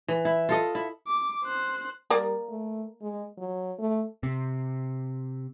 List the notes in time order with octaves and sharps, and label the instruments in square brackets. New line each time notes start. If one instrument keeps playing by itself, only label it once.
[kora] E3
E4
F4 A4 D#5
E4
[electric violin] D6
C5 F#6
[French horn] G3 [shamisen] A#3 A#4 D5
[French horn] A3
G#3
F#3
A3
[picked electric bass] C3